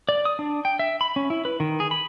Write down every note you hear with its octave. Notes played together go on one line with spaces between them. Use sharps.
D5
D#6
D4
G5
E5
B5
C#4
E4
B4
D#3
G#4
B5